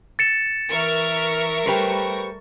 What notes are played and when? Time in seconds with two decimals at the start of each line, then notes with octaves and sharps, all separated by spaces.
0.19 A6 C#7 E7
0.69 E3 A#4 E5 C#6 F6
1.66 G3 A3 G4 B4 C5